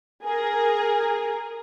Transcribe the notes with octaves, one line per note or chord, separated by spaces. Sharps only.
G#4 A#4